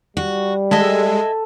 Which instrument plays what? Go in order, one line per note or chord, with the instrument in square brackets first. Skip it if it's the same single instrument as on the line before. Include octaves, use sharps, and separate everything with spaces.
[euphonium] G3 [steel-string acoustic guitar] F#4
[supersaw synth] G#3 [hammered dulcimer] A4 [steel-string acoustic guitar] D#5 E5 G#5